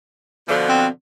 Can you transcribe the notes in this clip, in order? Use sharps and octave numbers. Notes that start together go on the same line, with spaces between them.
B2 D3 F3
C4